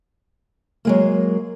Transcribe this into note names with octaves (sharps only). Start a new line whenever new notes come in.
F#3 G#3 A#3